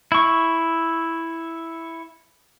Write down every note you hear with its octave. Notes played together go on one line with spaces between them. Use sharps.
E4 C#6